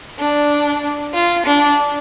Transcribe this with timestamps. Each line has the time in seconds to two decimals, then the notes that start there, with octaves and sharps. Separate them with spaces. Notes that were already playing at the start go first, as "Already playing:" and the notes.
0.20 D4
1.14 F4
1.46 D4